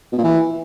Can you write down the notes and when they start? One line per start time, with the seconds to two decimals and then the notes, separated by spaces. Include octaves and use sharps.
0.12 B2
0.18 A#2
0.24 E3